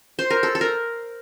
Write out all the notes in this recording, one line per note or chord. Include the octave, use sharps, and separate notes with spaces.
C5
A#4
A4
A4
A#4